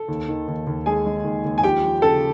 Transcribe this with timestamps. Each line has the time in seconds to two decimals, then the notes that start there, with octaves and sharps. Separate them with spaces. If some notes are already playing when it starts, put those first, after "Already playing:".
Already playing: A4
0.08 D#2
0.28 D#3
0.48 D#2
0.67 D#2
0.86 G#3 G#4 G#5
1.06 G#3
1.24 D#2
1.45 D#2
1.58 G#5
1.63 F3 G4 G5
1.83 F3
2.02 C#3 A4 A5